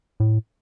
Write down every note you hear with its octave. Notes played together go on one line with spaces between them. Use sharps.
A2